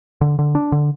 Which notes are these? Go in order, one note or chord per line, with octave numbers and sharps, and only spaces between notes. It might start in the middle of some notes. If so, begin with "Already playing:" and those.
D3
D3
D4
D3